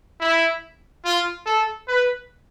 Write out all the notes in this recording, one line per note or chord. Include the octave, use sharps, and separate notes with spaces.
E4
F4
A4
B4